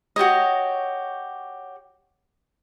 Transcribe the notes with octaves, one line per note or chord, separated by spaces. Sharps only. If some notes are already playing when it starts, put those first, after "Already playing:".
F#4 G4 C#5 D#5